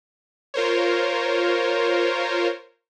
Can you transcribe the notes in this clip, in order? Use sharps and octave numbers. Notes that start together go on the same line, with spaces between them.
F4 A#4 C5 C#5